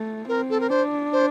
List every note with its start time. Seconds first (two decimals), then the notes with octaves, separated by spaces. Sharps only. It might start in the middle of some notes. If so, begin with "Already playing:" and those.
Already playing: A3
0.28 C4 A#4
0.50 A4
0.60 A#4
0.70 D4 C5
1.13 C5